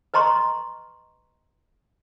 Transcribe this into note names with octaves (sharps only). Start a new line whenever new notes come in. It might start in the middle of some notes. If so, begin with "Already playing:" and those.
B4 D#5 A#5 C6 C#6